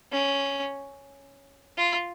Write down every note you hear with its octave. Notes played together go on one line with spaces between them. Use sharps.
C#4
F4